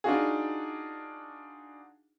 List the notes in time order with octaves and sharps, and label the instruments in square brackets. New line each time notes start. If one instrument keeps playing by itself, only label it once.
[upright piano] D4 D#4 F4 F#4 G#4